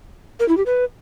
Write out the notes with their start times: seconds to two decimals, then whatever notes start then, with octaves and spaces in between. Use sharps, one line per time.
0.40 A#4
0.49 E4
0.57 G4
0.66 B4